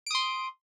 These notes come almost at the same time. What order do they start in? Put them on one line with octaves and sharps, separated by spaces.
D7 D#6 C6